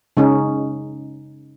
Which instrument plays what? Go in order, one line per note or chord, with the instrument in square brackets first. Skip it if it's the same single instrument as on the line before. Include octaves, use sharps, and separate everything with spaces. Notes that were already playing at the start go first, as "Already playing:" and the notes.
[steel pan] C#3 G#3 C#4 D#4